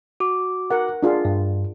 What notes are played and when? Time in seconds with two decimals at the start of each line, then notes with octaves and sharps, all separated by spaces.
0.20 F#4 D6
0.70 A#4 F#5
1.03 D4 F4 G#4
1.25 G2